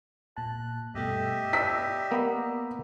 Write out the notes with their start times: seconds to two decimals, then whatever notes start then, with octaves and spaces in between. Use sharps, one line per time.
0.37 A#2 A5 F#6
0.95 G2 B2 A3 G4 D#5 E5
1.53 B4 D5 E6 B6
2.11 A#3 B3